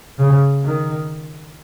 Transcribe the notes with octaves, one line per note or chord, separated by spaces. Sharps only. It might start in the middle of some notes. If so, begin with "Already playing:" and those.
C#3
D#3